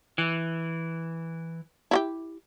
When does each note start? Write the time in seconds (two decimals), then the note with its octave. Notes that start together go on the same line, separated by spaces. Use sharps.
0.18 E3
1.91 E4 F#4 G4